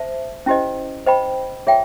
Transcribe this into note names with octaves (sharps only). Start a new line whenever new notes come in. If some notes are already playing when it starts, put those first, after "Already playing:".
Already playing: C5 E5 A5
C#4 E4 G4 C5 D#5
C5 D#5 G5 B5
F4 G#4 C#5 E5 G5